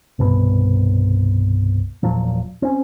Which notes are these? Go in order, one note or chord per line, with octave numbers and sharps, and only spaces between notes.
C2 G2 B2 B3
E1 A#2 F3 F#3
C4 C#4